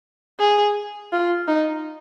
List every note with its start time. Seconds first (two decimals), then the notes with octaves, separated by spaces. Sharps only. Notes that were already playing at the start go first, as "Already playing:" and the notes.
0.40 G#4
1.12 F4
1.48 D#4